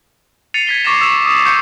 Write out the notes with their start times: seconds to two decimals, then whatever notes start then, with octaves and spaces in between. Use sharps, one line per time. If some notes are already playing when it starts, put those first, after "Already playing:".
0.54 A6 C7 C#7 D#7 F7
0.67 G#6 B6 G7
0.84 C#6 D6 A6 A#6 C7 E7
0.99 E6 B6 E7 F7
1.25 D#6
1.45 C#6 G6 C#7